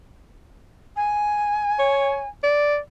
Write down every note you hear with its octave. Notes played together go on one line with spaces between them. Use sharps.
G#5
C#5
D5